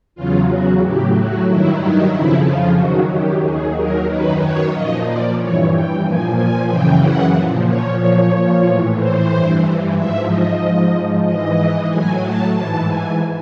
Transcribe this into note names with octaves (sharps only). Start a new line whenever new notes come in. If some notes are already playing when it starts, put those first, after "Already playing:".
E2 C#3 F#3 F4
F#4
A2 F#3 G4
F#4
G2 D#3 F#3 E4
D#4
F2 C#3 F3 E4
F4
F#2 D#3 F#3 F#4
G4
D#2 D#3 F#3 G#4
A#4
F#2 D#3 F#3 B4
C#5
A#2 F3 D#5
D5
G2 E3 C#5
G5
A#2 F3 G#5
G#5
F#2 C#3 E3 G5
F#5
A#2 F3
C#5
A#2 F3 C#5
A2 E3
C5
G2 E3
G#2 F3 E5
D#5
G#2 F3
G#2 E3 D#5
A2 F#3 G#5
A5
G#2 E3 A5
G#5